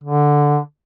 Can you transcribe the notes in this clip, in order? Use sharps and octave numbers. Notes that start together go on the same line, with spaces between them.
D3